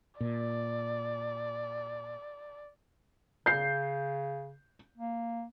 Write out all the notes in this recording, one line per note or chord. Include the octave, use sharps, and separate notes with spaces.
A#2 D5
C#3 G6 C7
A#3